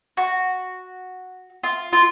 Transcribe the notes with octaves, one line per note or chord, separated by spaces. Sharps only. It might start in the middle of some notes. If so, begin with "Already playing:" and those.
F#4
F4
F4